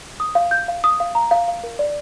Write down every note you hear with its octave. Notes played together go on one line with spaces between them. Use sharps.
D#6
F5
G6
F5
D#6
F5
A#5
F5
F5
A#4
D5